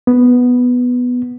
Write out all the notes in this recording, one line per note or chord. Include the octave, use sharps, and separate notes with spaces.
B3